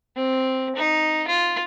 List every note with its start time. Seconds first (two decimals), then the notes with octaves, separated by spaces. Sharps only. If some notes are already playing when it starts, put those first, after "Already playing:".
0.15 C4
0.76 D#4
1.27 F4